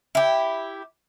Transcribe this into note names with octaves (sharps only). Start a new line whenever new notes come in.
E4 G4